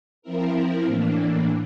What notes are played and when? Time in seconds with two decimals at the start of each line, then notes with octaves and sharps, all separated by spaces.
0.22 F3 C4 E4 A#4
0.85 A2 E3 A#3 D4